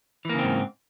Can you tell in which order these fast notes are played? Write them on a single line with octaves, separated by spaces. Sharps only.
E3 A#3 C#3 C4 G#2